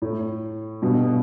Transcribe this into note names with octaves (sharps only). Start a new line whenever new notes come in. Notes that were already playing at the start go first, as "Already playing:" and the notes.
A2
G2 B2